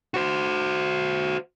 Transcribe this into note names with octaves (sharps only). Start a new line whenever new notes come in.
F#4 C5